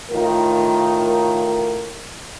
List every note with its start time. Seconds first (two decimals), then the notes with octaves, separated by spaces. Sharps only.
0.12 A2 D#3 F4 A#4